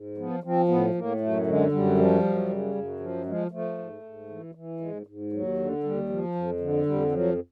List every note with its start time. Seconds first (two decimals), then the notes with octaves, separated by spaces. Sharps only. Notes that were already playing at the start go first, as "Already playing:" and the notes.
Already playing: G#2
0.17 F3 B3
0.44 F3 C4
0.68 A2 B3
0.94 A2 A#3
1.20 F#2 A3
1.46 D3 G#3
1.71 F#2 G3
1.98 F3
2.23 F#2
2.49 C#3
2.75 F#2
3.00 F3
3.25 F3 G#3
3.51 F3 A3
3.78 G#2
4.03 G#2
4.30 E3
4.55 E3
4.80 G#2 G#3
5.07 G#2
5.32 D#2 F#3
5.58 D3
5.83 D#2 G3
6.10 F3
6.35 F2
6.60 D3
6.86 F2 G3
7.12 F3 F#3